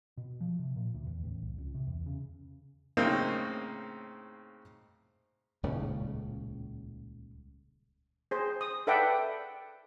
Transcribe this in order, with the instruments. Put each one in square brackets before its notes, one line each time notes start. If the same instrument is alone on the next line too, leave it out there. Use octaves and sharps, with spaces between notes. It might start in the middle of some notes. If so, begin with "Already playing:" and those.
[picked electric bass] B2
F3
C3
A#2
D2
E2
A1
C2
C#2
C3
E2
C#3
[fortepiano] A2 C#3 A#3 C4 D#4
[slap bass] D#1 C#2 A2 C#3
[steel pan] G#4 C5
D#6
A4 B4 D5 E5 F#5 G5